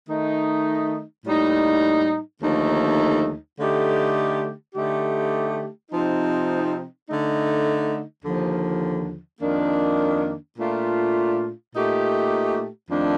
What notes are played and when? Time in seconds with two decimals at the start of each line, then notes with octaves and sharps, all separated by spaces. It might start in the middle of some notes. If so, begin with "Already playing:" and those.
0.08 D#3 A3 D#4
1.25 A2 G3 A#3 D#4
2.42 D#2 D3 F3 A3 D#4
3.58 D3 A3 D#4 G4
4.74 D3 A3 D#4 G4
5.91 C3 F3 C4 D#4
7.08 D3 A3 D#4
8.24 D#2 D3 F3
9.41 F2 D#3 A#3 D4
10.58 A#2 A3 D4 F4
11.74 A#2 A3 D#4 G4
12.91 F2 D#3 A3 D4